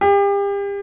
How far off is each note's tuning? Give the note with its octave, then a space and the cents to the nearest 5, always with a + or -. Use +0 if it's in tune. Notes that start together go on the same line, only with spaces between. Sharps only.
G4 +35